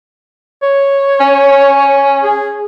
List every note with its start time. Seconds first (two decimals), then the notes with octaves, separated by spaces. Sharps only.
0.63 C#5
1.20 C#4
2.24 G#4